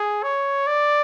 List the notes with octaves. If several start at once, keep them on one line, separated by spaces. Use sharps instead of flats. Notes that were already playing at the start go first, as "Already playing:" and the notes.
Already playing: G#4
C#5
D5